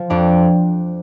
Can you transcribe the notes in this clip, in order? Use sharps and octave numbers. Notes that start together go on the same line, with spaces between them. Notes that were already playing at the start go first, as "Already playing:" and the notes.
Already playing: F3
F2 D4